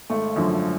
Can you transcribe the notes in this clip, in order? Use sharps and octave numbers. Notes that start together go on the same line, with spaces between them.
G#1 A3
F#2 D3 F3